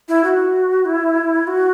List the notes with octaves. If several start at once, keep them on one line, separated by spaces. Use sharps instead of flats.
E4
F#4
E4
F#4